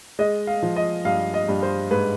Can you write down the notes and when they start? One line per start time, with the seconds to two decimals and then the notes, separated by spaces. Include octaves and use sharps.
0.19 G#3 D#5
0.47 F5
0.63 F3
0.76 D#5
1.05 G2 F5
1.34 D#5
1.49 G2
1.63 C5
1.91 G#2 B4